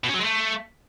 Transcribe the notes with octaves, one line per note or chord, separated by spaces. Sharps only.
B2
C#4
F#3
G#3
A3